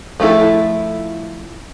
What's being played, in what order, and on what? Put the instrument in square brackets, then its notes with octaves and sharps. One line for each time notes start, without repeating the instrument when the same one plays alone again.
[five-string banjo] F3 A3 C4 E4 A4